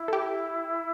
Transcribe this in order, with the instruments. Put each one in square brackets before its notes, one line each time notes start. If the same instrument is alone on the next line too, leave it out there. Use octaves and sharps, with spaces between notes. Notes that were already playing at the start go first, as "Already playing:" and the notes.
Already playing: [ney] E4
[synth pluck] A4
G4